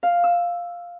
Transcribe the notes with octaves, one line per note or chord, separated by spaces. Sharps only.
F5
E6